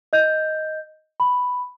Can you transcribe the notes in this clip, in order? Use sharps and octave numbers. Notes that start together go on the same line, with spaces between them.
D#5 G6
B5